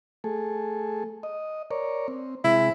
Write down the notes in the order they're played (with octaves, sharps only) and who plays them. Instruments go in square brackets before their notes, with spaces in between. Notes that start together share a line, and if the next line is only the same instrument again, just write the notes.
[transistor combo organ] A3 G#4 A4
D#5
A#4 C#5 D5
C4
[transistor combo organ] C3 G#3 [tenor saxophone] E4